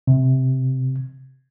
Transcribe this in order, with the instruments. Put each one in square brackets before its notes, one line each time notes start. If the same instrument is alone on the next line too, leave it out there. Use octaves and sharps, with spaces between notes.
[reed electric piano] C3